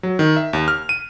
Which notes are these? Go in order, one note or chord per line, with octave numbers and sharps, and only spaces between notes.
F#3
D#3
E5
D#2
F6
D#7